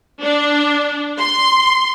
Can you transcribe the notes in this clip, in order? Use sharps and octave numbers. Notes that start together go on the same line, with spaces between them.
D4
C6